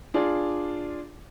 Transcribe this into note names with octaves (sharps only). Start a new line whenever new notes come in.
D4 F4 G#4 D5